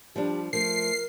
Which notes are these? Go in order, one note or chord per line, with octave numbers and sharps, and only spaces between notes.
F3 G3 D4 G4
F3 A3 A#4 C7